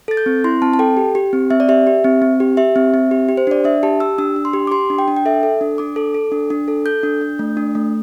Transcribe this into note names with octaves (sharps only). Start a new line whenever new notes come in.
A4 A6
G6
C4
E4 C6
C4 A5
A5
A4 G5
G4
G4
C4
C4 E5
D5
G4 E5
G4
C4
C4
G4
G4 E5
C4
C4
G4
G4
C5
D4 D5
D4 E5
G4 A5
G4 E6
D4 E6
D4
C6
G4
D6
G4 C6
D4
G5
D4
G5
A4 E5
A4
D4
D4 D6
A4
A4
D4
D4
A4
A4 G6
D4
D4
A3
D4
A3